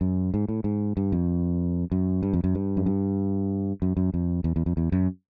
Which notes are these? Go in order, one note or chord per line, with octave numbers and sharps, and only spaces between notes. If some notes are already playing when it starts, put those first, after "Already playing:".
F#2
G#2
A2
G#2
G2
F2
F#2
G2
F2
F#2
G2
F#2
G2
F#2
F#2
F2
E2
E2
F2
E2
F#2